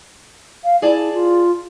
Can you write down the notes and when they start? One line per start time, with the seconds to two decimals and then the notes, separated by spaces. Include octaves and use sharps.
0.64 F5
0.82 E4 G#4 D5 A5
1.14 F4